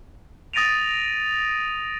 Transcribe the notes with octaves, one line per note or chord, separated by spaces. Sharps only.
D#6 A6 A#6 D7 D#7 F7